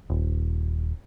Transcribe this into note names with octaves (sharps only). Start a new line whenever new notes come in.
D#1